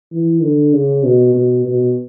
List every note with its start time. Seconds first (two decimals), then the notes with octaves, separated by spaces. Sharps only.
0.12 E3
0.43 D3
0.73 C#3
1.04 B2
1.34 B2
1.65 B2